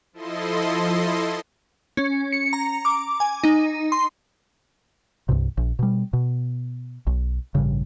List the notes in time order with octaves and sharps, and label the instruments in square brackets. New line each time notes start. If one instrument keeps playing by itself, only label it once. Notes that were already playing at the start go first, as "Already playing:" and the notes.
[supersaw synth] F3 E4 A4 D#5 C6
[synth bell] C#4
C#7
A#5
D6
G#5
D#4
C6
[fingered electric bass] C2 G2 C3
A#1
B2 G3
B2
B1
A1 G2 C#3